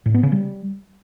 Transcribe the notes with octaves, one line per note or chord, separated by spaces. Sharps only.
A2
B3
C#3
G3